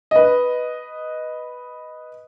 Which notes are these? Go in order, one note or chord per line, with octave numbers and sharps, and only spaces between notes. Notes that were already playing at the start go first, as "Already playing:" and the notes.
B4 D#5